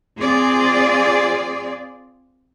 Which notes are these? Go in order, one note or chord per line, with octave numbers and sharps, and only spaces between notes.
C4 F4 G#4 D5